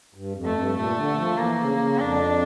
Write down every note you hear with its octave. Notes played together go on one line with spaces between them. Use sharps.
G2
F2
A3
G2
A#2 A3
D3
F3
E3 A#3
C#3
C#3
F2 D4